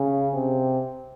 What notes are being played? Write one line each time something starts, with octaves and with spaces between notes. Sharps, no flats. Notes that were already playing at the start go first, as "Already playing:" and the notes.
Already playing: C#3
C3